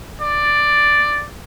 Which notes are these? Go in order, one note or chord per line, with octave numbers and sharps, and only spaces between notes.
D5